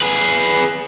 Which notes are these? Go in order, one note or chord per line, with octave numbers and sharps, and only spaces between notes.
G#4 B4